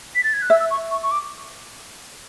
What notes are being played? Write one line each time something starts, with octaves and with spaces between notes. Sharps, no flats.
B6
A6
G#6
F#6
E5 E6
E6
C#6
C#6
C#6
D6